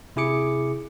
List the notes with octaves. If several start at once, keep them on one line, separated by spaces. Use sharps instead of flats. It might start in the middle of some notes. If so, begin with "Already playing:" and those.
C3 E4 G#4 D6 C#7